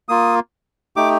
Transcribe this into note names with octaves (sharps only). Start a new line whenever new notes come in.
A#3 F4 D#6
A3 D#4 G4 D6